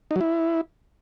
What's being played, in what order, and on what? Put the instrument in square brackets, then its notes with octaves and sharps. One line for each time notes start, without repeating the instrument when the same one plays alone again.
[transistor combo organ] D#4
F#3
E4